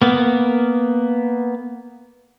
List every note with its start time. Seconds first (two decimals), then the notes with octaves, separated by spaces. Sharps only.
0.02 A#3 B3